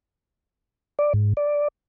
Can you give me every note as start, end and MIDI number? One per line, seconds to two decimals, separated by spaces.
0.99 1.13 74
1.14 1.33 44
1.37 1.68 74